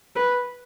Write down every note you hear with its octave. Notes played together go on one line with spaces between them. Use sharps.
B4